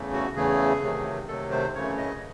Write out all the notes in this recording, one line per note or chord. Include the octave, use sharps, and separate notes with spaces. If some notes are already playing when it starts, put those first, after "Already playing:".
Already playing: E2 C#3 E3 A3
F#4
E2 C#3 E3 A3 G#4
C3 D#3 F#3 A3
C3 D#3 F#3 A3 A4
C5
F#2 C#3 E3 A3 C#5
D#5